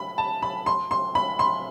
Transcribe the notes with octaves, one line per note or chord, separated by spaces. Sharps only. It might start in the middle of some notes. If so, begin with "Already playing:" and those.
Already playing: B5
A5
B5
C6
C6
B5
C6